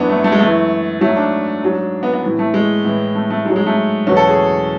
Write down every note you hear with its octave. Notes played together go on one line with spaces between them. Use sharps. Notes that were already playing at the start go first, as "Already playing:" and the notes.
Already playing: F#2 E3 B3 D4
A3
A3
G#3
F#2 E3 A3
G#2 F#3 A3
D4
G#2 F#3
B3
B3
A2 E3
A3
G#3
A2 E3
A3
A3
G#2 F#3 G#3
G#3
A3
E2 B2 F#3 C#4
A4
G#4